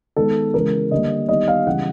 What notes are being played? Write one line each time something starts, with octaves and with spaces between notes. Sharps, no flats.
D#3 G#3 B3 A4
C#3 E3 G#3 A#4
D3 G3 A#3 D#5
D#3 G3 B3 D#5
F5
C#3 E3 G3 F#5